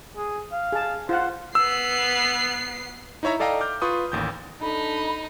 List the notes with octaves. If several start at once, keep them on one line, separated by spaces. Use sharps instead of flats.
G#4
F5
G#4 A5
F4 C5 F#5
B3 E6 C7
D#4 E4 C#5 E5 A#5
A4 D5 D#5 F5 G5 A#5
D6 F6 G6
F4 B4 C6 C#6 D#6
A1 D#2 G6
D4 D#4 A4 B5